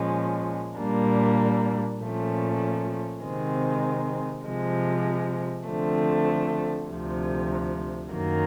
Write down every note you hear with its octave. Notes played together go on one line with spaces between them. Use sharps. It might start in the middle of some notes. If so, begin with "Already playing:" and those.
Already playing: A#2 F3 G#3 C#4
A#2 G3 A#3 D4
A#2 F3 A3 C#4
C3 D#3 G#3 C4
C3 F3 G#3
D3 F3 A3 C4
D2 C3 F3
F#2 D#3 F#3 A#3